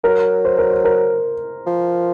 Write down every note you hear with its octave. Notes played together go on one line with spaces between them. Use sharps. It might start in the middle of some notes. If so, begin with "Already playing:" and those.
F#3 A#4
C5
A#4
C5
A#4
F3